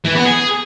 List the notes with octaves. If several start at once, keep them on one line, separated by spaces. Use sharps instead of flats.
E3
B3
G#4